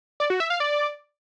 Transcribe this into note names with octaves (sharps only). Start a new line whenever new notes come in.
D5
F#4
E5
F5
D5